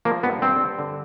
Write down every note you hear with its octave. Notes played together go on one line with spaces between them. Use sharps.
F3 A#3
G2 B3
G2 C4
G2
D3